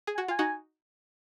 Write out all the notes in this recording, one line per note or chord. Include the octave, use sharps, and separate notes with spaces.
G#4
G#5
F#4 F#5
F4 G#5
D#4 F#4